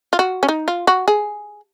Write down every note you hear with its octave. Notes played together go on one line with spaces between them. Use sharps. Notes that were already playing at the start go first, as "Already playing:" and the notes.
F4
F#4
C#4
D#4
F4
F#4
G#4